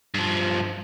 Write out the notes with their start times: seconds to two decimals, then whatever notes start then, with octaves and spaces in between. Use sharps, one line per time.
0.14 G2 F3